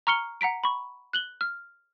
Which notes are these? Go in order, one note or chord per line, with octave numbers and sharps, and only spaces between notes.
A#5 C#6 F6 C#7 G7
F#5 A#5 B6 D7
B5 C#6
F#6 F#7 G7
F6